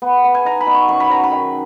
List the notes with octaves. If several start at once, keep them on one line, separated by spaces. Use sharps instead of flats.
B3
B3
G#5
D#4 A#5
B5
B2
C#6
F#2 C#6
B5
F#3 A#5
B5
D#3